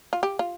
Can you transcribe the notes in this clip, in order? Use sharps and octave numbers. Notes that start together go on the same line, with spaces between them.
F4
G4
F4